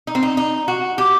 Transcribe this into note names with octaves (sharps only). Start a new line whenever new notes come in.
D#4
C4
D#4
D#4
F#4
G4